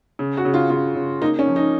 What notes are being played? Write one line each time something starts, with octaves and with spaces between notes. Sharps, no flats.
C#3
F#4
C#3
F4
C#3 F4
C#3
A#3 D#4
C#4
F3
D#4